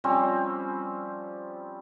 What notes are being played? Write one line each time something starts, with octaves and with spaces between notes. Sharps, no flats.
F3 G3 C4 C#4